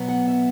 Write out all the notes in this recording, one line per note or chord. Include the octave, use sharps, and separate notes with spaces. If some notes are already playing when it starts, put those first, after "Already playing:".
Already playing: B2 F#3 B3
F#5
E5